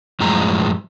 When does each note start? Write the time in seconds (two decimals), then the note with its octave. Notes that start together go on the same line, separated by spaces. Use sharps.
0.20 F#2 A2 F3 G#3 A#5